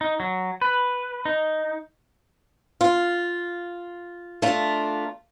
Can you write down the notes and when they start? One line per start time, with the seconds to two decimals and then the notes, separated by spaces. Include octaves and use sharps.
0.01 D#4
0.20 F#3
0.61 B4
1.25 D#4
2.81 F4
4.42 A3 D4 F4 A#4